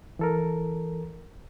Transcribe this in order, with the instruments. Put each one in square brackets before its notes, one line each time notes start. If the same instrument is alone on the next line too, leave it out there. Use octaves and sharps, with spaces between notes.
[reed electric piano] E3 A4 A#4